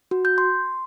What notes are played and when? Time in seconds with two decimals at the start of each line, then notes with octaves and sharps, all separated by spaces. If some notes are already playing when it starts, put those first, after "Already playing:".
0.11 F#4
0.25 G6
0.38 C6